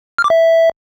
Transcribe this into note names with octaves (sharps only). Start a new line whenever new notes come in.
F6
D6
E5